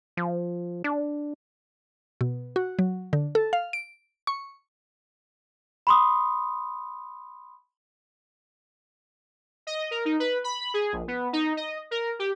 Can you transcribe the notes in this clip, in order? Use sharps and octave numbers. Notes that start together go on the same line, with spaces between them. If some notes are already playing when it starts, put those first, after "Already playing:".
F3
D4
B2
F#4
F#3
D3
A4
F5
D7
C#6
B5 C6 D#6
D#5
A#4
D#4
B4
B5
G#4
A#1
B3
D#4
D#5
A#4
G4